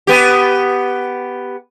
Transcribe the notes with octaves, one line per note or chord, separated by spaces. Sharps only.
B3 G4